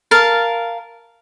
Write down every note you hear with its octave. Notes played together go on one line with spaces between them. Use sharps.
A#4 F5 A5